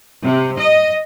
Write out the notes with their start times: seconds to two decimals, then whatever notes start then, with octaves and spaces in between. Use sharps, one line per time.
0.24 C3
0.57 D#5